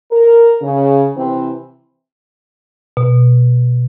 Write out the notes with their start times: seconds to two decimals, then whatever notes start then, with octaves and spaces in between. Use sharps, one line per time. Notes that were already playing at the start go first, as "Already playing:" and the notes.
0.12 A#4
0.61 C#3
1.17 C3 E3 C4
2.97 B2